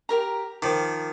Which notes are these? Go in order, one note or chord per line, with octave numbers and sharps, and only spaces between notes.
G4 A#4 A#5
D#3 F3 D6